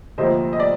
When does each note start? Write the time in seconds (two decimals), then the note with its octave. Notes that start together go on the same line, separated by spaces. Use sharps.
0.18 D2 C3 F3 A#3 C5 D#5
0.53 D#5
0.60 D5